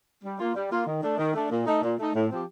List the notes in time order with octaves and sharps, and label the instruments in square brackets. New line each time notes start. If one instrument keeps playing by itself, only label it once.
[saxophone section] G3
A#3 F4
G3
A#3 F4
D#3
A3 D4
D#3
A3 D4
A#2
A3 D#4
A#2
A3 D#4
A2
F3 C4 G4